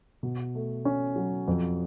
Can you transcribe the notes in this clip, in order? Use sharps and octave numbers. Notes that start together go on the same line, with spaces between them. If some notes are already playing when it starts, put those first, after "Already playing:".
B2
A3
C#4
F#3
F2